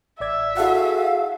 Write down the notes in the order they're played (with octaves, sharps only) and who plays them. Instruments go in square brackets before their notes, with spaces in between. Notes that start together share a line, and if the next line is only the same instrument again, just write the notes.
[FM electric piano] A1 D5 G#6 [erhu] E5
[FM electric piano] E4 A4 F#5 [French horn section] F#4 G#4 [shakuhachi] F5